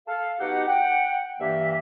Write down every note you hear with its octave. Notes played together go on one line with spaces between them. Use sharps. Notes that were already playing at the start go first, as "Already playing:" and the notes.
A4 F5
B2 D#4 G4 F#5
F#5 G5
G2 E3 A#3 E5